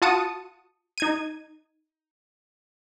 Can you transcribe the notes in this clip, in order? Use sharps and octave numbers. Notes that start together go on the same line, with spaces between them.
F4 F#4 A5 D#6 C#7 D#7
D#4 G#6 D#7